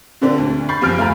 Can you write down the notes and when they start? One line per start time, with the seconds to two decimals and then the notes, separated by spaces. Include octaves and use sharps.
0.22 A#2 D3 A#3 C4 D4
0.38 D2
0.69 B5 C#6 G6 A6 C7
0.81 F#1 D#2 F3 F6 D7
0.97 F#1 A3 F5 G#5 A#5 B5